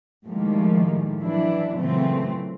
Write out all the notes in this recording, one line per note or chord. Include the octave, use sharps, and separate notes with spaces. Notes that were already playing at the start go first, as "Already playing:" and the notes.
A2 D#3 F3 G3 G#3 A#3
E3 F#3 D4 E4
A#2 C#3 E3 F#3 A3 C4